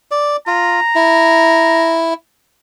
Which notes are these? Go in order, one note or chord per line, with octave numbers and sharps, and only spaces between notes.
D5
F4 A#5
E4